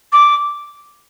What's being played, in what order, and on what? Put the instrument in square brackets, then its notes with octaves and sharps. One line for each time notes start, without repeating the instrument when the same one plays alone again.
[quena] D6